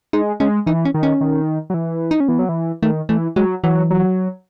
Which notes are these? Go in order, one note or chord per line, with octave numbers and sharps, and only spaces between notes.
G#3 D#4
G#3 C#4
E3 D#4
C#4
D#3
C#4
D#3
F#3
E3
D#4
C#4
E3 B3
F#3
E3
D#3 A3
E3 A3
F#3 G#3
E3 F#3
F#3